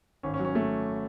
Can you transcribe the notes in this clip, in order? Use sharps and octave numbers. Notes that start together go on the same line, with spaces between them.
G#1 C#4
C#4
F#3
C#4
A3